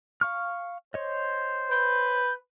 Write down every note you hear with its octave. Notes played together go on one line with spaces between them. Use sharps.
F5 C#6 F6
C5 C#5 D#5
B4 G6